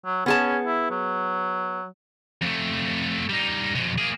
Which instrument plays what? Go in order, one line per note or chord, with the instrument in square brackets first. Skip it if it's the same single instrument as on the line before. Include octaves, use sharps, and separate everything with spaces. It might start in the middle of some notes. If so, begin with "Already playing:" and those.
[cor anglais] F#3
[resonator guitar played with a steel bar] B3 G#4 A5 [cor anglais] C#4
[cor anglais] E4
F#3
[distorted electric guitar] F2 A3
G3 D#4
F2 B2
A#3 G#4